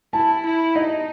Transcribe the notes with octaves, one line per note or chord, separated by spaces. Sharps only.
E4 A5
E4
D#4 D#5